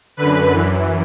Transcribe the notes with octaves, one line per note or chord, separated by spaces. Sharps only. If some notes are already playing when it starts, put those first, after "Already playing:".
F#2 D3 B4
F#2 E3